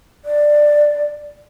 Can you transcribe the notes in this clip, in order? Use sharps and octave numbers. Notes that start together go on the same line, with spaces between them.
D5